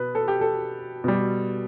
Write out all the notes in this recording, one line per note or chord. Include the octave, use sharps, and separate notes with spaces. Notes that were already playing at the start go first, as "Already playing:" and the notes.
Already playing: B2 B4
A4
G4
A4
B2 G3